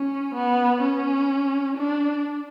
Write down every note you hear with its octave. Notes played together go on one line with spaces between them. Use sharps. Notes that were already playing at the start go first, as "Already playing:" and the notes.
Already playing: C#4
B3
C#4
D4